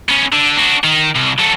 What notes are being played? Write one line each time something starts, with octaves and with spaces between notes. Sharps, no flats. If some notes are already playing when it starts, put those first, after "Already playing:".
B3 C#4
D3
D4 F#4
D#3
C2
F#3 A3